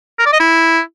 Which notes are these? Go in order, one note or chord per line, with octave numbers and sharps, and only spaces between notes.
A#4
D5
D#5
E4